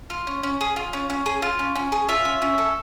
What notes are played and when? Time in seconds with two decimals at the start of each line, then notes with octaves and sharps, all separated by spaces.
0.10 F4
0.27 C#4
0.43 C#4
0.61 G#4
0.76 F4
0.93 C#4
1.10 C#4
1.26 G#4
1.42 F4
1.59 C#4
1.75 C#4
1.92 G#4
2.09 F4 E5
2.25 C#4
2.42 C#4
2.58 A4